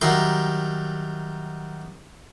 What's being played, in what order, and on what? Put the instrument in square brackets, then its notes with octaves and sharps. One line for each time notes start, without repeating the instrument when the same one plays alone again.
[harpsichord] D#3 F#3 G3 E5 A#5 C6